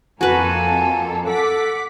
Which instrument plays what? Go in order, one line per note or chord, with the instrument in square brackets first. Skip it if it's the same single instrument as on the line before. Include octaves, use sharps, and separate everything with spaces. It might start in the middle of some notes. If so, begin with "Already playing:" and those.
[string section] F2 A#3 A4 [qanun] F#4 B4 [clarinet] G#5
[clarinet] A4 [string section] F#5 D6 B6